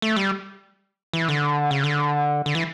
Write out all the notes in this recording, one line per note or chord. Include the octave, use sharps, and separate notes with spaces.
A3
G3
E3
D3
C#3
D3
D3
E3